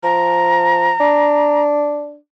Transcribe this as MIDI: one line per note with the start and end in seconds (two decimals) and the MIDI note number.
0.03 0.91 53
0.03 1.62 82
1.00 2.16 62